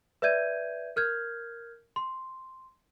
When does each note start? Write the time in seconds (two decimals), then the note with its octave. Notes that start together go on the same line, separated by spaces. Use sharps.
0.22 B4 D5 E5 G6 G#6 D#7
0.96 A#4 F6 G6 G#6
1.96 C6